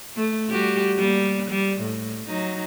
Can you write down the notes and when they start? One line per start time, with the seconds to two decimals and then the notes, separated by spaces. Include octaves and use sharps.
0.16 A3
0.50 G3 F#4 G4
0.98 G3 A#3
1.50 G3
1.81 A2
2.27 F#3 D#4